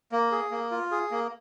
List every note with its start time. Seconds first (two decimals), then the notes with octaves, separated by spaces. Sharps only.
0.12 A#3
0.31 G#4
0.51 A#3
0.71 F4
0.91 G#4
1.11 A#3